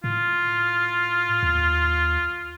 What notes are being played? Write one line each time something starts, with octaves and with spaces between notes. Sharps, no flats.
A2 F4
D#2